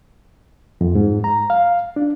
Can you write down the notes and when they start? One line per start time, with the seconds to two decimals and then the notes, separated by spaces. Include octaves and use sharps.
0.81 F2
0.95 G#2
1.24 A#5
1.50 F5
1.96 D4